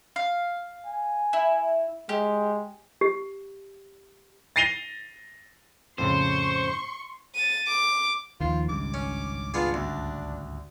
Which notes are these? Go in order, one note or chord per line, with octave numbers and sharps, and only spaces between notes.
F5
G#5
E4
G#3 G4
G4
A6 A#6 C7 D#7 F7 G7
F2 A2 C#3 C5 C6 C#6
A6 D#7
D6
D#2 D#3 F3 F4
G#1 C#2 G2 D6
C#4
B3 D4 F4 G#4
D2